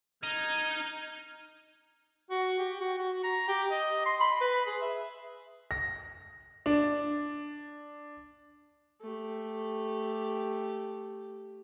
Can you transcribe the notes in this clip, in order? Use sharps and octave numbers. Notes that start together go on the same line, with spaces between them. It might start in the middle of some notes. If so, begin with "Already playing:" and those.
D#4 F6 G#6
F#4
G4
F#4
F#4
A#5
G4
D#5
C6
B5
B4
G#4
E5
A#6
D4
A3 G4